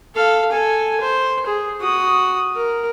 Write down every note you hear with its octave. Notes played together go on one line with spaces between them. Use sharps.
A4 F5
A4 G#5
C5
G#4
F#4 D#6
A#4